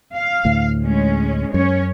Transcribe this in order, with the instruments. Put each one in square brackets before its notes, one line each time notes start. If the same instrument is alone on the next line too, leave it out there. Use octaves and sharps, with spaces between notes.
[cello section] F5
[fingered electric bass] D2 A2
[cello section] G#3 C#4
[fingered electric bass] F#2 [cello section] C#4 C#5